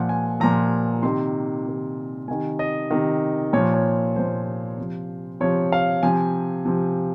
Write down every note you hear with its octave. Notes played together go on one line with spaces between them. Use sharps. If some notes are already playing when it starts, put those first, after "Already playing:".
Already playing: A#2 F3 F#5
G#5
A#2 F3 A#5
C3 D#3 C6
C3 D#3
C3 D#3 G#5
D#5
C3 D#3
A#2 F3 C#5
C#5
A#2 F3 C5
C3 F3
C3 F3 C#5
F5
C3 F3 G#5
C3 F3